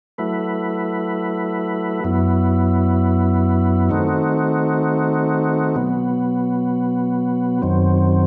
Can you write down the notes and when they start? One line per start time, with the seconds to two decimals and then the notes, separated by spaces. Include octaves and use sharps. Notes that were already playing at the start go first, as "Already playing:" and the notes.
0.18 F#3 A3 E4 B4
2.04 F#2 F#3 B3 E4
3.89 D#3 A3 C4 D#4 F#4
5.76 B2 F#3 B3
7.62 F#2 D#3 F#3 C4